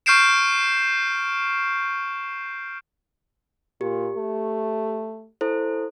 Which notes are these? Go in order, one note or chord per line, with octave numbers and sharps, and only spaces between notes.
C#6 F6 G6 C7 D7 E7
A#2 G4
A3
E4 A4 C5